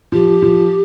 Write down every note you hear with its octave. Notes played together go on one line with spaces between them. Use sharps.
F3 G4
F3